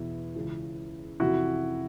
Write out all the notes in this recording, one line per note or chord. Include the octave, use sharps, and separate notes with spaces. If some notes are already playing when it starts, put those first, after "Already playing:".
Already playing: E2 B2 E4
C#2 C#3 E3
F2 C3 E3 E4 F#4